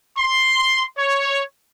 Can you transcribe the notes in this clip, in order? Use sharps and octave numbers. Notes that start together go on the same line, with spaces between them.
C6
C#5